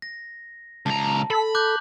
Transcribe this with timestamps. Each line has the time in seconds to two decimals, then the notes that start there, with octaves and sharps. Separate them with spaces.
0.02 A#6
0.86 C#2 A5 A#5
1.30 A4 B5
1.55 D6 F#6 G6